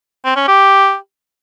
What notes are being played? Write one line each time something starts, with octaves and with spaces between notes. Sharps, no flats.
C4
C#4
G4